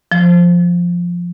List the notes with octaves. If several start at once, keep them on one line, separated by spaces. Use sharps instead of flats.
F3